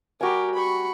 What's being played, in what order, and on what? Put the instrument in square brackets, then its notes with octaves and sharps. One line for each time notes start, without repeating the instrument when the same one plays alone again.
[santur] G3 F#4 G#5 [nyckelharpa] G4 A#4
[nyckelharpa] B5 C#6